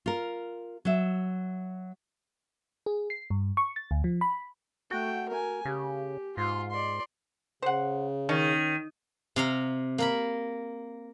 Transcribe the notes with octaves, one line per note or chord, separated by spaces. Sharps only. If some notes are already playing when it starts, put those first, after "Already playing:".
F4 A#4
F#3 E5
G#4
C7
G2
C#6
A6
D2
F3
B5
A3 F#4 G5
A#4 G#5
C#3 G4
G#2 F4 C6
D5 C6
C#3 C5 F#5
D#3 C#4
C3 F5 A#5
A#3 A#4 B5